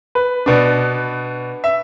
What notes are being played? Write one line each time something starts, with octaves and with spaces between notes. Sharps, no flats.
B4
B2 B3 D4
E5